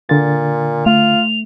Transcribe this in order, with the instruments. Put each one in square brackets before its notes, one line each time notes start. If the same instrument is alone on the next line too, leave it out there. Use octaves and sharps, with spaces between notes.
[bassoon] A#2 [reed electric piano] D3 A6
[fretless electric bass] A3 [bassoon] F4 [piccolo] F7